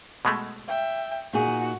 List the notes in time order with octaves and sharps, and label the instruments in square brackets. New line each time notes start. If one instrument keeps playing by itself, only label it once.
[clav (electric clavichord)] B2 G#3 A3
[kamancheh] E5 G5
[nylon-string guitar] A#2 D#4 G#4 [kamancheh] F#4